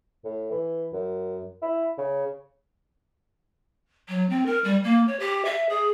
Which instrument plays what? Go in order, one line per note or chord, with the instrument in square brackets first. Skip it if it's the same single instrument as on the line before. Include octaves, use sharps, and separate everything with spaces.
[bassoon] A2
E3
F#2
E4
C#3
[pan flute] F#3
C4
A#4
G3
A#3
C#5
G4
E5
G#4